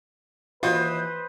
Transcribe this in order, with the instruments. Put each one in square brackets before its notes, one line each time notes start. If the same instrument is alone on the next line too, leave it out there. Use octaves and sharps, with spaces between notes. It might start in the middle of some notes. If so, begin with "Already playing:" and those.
[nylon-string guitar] D#2 E3 D#5 [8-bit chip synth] F4 F#4 [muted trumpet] B4 [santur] C5 D#6